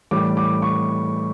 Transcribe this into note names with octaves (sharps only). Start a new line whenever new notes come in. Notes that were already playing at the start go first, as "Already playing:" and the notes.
A2 E3 G3 D6
D6
C#6